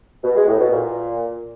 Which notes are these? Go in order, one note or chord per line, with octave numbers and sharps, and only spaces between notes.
B2
G#3
A2
B2
A#2